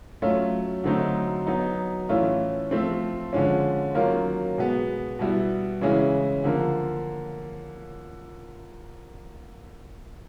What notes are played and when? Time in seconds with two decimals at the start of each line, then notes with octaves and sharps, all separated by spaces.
0.22 F#3 A3 C#4 F4
0.84 D3 F#3 A3 C4 D#4
1.47 F#3 B3 D#4
2.09 A2 E3 A3 C#4 F4
2.71 F3 A3 C4
3.33 D3 F3 G#3 C#4
3.95 D#3 F#3 A#3 C#4 F4
4.58 B2 G#3 B3
5.19 B2 G3 B3 E4
5.82 C#3 E3 G#3 C#4 E4
6.44 D3 F3 A#3